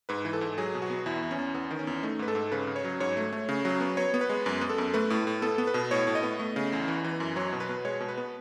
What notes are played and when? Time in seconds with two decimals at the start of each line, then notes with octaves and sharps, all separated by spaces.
0.09 G#2 B4
0.25 E3
0.33 A4
0.41 G#2
0.58 F#3 G#4
0.74 B2
0.82 F#4
0.90 B3
1.06 E2 E4
1.22 E2
1.31 C#4
1.39 E2
1.54 E2 B3
1.71 D#3
1.79 C#4
1.87 E2
2.03 A3 D#4
2.19 G#2 B4
2.28 A4
2.35 G#2
2.52 C#3 B4
2.67 C#3
2.76 C#5
2.84 F#3
3.00 G#2 C#5
3.17 A3
3.32 A3
3.49 C#3
3.65 F#3
3.81 B3
3.97 B3 C#5
4.14 B3
4.21 B4
4.29 G#3
4.46 F#2
4.61 B3
4.70 A4
4.78 F#2
4.94 A3 B4
5.10 A2
5.27 A2
5.42 B3 A4
5.58 B3
5.67 B4
5.74 B2
5.91 A2 C#5
6.07 A2
6.15 D#5
6.23 B3
6.39 A3
6.56 C#3
6.72 E2
6.88 E3
7.04 E3
7.20 F#2
7.36 F#3 C#5
7.53 B2
7.60 B4
7.69 B2
7.85 G#3 C#5
8.01 B2
8.09 B4
8.17 B3